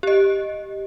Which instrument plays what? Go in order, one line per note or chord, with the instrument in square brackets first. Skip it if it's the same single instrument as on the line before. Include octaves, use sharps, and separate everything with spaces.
[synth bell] G4 D#5